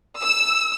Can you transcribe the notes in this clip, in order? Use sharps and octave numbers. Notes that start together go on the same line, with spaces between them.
E6